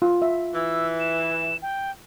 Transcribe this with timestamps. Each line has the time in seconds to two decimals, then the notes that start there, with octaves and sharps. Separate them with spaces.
0.02 F4
0.22 E5
0.55 E3 E6
1.00 E7
1.62 G5